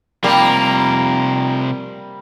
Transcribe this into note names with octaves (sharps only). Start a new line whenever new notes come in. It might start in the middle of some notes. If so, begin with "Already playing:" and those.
C3 F3 G3 A#3